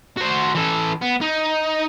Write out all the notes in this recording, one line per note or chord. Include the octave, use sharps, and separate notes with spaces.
F#4 C5
E3 A4
B3
D#4